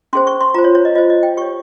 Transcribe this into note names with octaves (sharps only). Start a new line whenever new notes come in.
C#4 G#4 C5 C6
C#6
C6
F4 C5 A#5
C#5
C#5
D#5
F4 C5 D#5
D#5
G5
G4 C#5 C#6